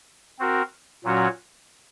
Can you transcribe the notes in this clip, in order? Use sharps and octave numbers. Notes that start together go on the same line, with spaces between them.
C4 F#4 A#4
A#2 F#3 C#4 F#4 C#5